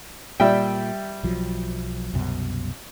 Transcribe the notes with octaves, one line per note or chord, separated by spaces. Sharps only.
A#2 G3 E5 G5
B1 F3 F#3
C2 F#2 B2